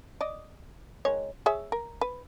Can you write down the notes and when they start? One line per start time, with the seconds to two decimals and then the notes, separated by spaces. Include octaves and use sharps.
0.21 D5 D#5
1.05 D#3 G#3 C#5
1.46 G#4 C#5 E5
1.72 A#4
2.01 B4